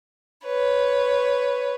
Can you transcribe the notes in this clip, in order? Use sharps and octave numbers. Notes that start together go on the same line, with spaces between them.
B4 C#5